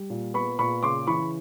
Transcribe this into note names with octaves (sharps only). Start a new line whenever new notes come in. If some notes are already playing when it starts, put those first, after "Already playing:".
Already playing: G3
A#2
B3 B5 C#6
A#2 B5 C#6
C#3 C6 D6
E3 B5 C#6